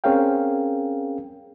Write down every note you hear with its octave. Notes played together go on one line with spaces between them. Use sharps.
C4 C#4 G#4 A#4 F5 G5